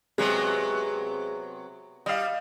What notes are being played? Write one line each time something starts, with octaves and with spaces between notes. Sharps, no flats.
C3 F#3 G#3 B3
G3 D#5 F5